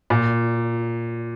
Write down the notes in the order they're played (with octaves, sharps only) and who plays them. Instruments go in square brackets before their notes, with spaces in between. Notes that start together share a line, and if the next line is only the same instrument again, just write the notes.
[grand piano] A#2